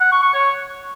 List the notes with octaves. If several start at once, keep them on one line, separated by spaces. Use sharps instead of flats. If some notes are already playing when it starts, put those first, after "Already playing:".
F#5
C#6
C#6
C#5